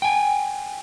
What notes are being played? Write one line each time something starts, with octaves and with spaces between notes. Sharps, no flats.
G5 G#5